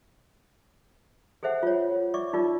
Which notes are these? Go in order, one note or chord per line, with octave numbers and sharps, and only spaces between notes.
G#4 A4 C5 E5 F#5
F4 C#5
D5 E5 C#6 D6
D#4 F4 A#4 D5